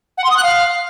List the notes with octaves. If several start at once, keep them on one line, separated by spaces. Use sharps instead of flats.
F#5
C6
D#6
F#6
F5